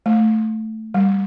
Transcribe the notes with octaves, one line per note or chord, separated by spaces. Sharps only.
A3
G3